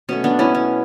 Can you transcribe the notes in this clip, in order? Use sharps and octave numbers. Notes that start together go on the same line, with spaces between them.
B2 F#3 A3 C#4
B3 D4
C#4 E4
C#4